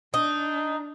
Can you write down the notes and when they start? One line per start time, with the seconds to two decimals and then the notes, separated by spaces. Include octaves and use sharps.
0.14 D4 D#4